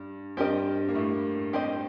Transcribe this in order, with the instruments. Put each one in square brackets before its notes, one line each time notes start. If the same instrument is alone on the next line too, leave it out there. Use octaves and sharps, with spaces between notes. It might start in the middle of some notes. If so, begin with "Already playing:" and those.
Already playing: [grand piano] G2
[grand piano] G2 G3 [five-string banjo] C4 G4 A#4 D#5
[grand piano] A#3
A2 A3
[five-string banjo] C4 G4 C5 D#5